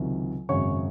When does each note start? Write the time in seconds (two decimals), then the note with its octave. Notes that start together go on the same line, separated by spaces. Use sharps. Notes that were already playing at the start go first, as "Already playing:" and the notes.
Already playing: C#2 C3 D#3 F#3
0.49 G#1 F#2 C#3 G#3 C#5 C#6